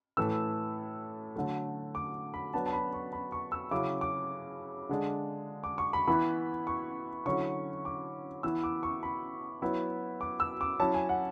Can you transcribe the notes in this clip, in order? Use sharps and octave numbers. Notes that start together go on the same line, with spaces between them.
A2 E3 A3 E6
D3 F#3 A3
D6
B5
F#3 B3 D4 A5
A5
B5
C#6
B5
C#6
E6
C#3 F#3 C#4 E4 D6
D6
D3 G#3 D4
D6
C#6
B5
E3 B3 E4 B5
C#6
D3 F#3 C#4 E4 C#6
D6
E3 B3 E4 E6
D6
C#6
B5
F#3 B3 E4
D6
E6
D6
F#3 C#4 E4 A5
G#5
F#5